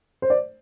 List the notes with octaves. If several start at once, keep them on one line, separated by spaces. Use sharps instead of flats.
C5
D5